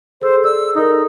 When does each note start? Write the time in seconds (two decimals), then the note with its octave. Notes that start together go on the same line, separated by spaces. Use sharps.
0.22 G#4 A4 C5 E6
0.44 D5 E6
0.75 D#4 A4 A#4